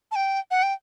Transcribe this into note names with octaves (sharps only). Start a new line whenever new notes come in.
A5
G5
F#5
G5